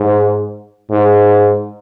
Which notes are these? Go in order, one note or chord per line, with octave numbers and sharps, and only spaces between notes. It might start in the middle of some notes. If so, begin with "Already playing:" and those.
Already playing: G#2
G#2